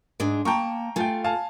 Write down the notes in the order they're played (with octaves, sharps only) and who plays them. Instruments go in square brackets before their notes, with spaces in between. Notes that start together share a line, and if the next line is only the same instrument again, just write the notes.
[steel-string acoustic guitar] G#2 G#3 D4
[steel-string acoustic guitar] A#3 A5 [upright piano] G5 A#5 C#6
[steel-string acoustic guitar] A3 F4 [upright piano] G5 G#5
[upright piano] F5 G#5 A5